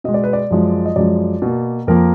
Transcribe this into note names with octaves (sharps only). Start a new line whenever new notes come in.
B2 G#3 D#5
D5
B4
D5
F#2 F3 G#3
D#5
F#2 F3 G#3 D5
B2 A#3
F2 F3 A#3 A#4